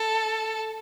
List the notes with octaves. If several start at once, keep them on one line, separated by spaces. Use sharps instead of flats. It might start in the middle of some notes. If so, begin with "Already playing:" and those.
Already playing: A4